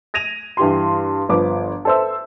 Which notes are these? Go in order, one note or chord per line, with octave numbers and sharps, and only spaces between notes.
G#6 A#6 D#7 F7
G2 E3 G4 C6
G1 F3 B4 D6
A4 B4 C5 E5 E6